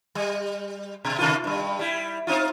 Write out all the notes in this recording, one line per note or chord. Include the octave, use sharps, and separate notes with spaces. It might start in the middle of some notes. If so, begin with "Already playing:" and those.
G3
B2
C3 D#3 F4
G2 G3
G3 E4
C4 D#4 F4